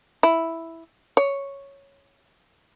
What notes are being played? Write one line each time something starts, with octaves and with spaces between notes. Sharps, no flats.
E4
C#5